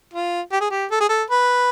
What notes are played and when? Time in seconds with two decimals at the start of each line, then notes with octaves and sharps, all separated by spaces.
0.14 F4
0.52 G4
0.61 G#4
0.71 G4
0.91 A4
1.00 G#4
1.09 A4
1.30 B4